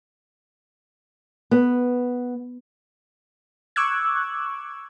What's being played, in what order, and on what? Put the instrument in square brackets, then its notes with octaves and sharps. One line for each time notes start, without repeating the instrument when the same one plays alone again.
[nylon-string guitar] B3
[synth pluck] C#6 D6 E6 F#6 G#6